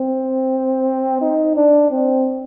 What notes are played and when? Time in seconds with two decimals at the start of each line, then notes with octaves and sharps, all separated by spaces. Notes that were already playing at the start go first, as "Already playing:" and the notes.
Already playing: C4
1.22 D#4
1.56 D4
1.91 C4